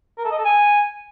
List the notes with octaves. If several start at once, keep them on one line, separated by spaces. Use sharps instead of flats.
A#4
A4
D#5
A4
G#5